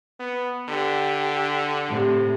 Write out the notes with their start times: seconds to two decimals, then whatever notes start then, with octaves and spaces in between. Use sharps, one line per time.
0.20 B3
0.69 D3 G4
1.88 A2 C3